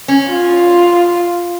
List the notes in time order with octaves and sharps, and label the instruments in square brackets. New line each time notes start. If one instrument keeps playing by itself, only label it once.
[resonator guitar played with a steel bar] C#4
[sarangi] F4